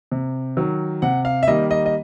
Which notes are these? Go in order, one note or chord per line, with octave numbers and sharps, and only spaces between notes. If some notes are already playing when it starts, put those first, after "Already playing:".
C3
D#3 F#3
C3 F#5
F5
E5
D#3 G3 A#3 D#5
D#5
D#5